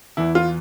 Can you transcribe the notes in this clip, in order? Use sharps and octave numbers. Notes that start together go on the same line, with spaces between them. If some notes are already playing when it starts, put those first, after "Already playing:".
E2 E3 E4
F4